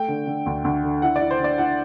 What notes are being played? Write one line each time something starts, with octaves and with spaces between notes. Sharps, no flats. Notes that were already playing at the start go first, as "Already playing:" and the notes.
Already playing: A3 G5
D3
D3
D2
D2
D3
E4 F#5
E4 D5
C5
D3
D5
E4 F#5